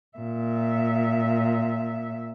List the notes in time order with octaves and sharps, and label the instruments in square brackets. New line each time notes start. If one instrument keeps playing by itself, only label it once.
[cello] A#2 E5